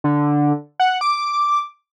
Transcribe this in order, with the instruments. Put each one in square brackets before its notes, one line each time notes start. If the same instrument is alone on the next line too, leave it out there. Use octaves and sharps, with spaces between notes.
[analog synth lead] D3
F#5
D6